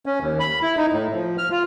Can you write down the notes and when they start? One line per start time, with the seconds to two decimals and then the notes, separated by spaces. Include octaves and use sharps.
0.06 C#4
0.21 D#2
0.40 B5
0.62 E4
0.77 D#4
0.92 A2
1.14 F3
1.38 F6
1.51 F4